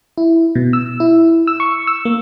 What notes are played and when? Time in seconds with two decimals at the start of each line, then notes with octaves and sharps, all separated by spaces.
0.18 E4
0.55 B2
0.73 E6
1.00 E4
1.47 E6
1.60 C#6
1.87 E6
2.05 A#3